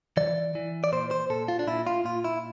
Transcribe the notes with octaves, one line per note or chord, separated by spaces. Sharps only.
E3 D5
E3
D5
A#2 C5
C5
A#2 A4
F4
D4
A#2 E4
F4
A#2 F4
E4